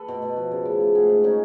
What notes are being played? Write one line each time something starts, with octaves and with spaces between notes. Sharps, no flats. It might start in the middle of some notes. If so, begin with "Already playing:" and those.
Already playing: A4 B4
B2
B2
F3
C#3
C#3
A3
G#2 F#4 G#4
G#2
C#4 D#4